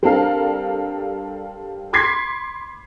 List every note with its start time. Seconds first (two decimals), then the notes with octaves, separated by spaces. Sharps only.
0.03 G3 C4 D4 A4 A#4 F5
1.93 B5 C6 D6 G#6 B6 C7